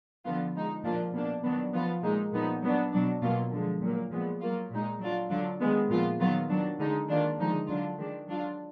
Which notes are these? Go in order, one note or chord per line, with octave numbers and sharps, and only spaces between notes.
D3 F3 B3 F4
F3 G#3 D#4
A#2 F3 A#3 D4 F4
B2 A#3 D4
D#3 F#3 B3 D4
F3 B3 F4
A#2 G#3 D#4
A#2 F3 B3 D#4
F#3 B3 D4
B2 F#3 D4
B2 F#3 A#3 F4
D3 F3 G#3
A#2 F#3 A#3
A#2 F3 G#3 B3
F#3 A#3 F4
A#2 G#3 D#4
F#3 D4 F4
D3 F#3 D4 F4
D#3 G#3 B3
A#2 F3 B3 F4
D#3 F#3 B3 F4
D#3 F#3 D4
D3 G#3 D#4
D#3 A#3 D4 F4
D3 F3 G#3 D#4
D3 F#3 D4 F4
D#3 G#3 D4
F#3 D4 F4